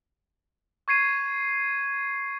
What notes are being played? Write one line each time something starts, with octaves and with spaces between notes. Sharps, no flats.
C#6 G#6 C7 D#7